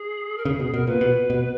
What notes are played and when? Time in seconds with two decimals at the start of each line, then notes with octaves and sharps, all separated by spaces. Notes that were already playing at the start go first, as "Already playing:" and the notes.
Already playing: G#4
0.37 A#4
0.45 C#3 G#4
0.59 B2 G#4
0.74 B2 A#4
0.87 A#2 B4
1.01 B2
1.30 B2